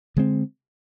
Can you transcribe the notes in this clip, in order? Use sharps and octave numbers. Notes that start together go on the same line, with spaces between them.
D3 G#3 C4